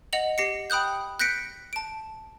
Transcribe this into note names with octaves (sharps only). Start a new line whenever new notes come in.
D#5 F#5 F7 F#7
G4 A#6 C7 C#7
G5 B5 D#6 F#6 G6
F#6 G6 A#6 B6 C#7 D7
A5 D7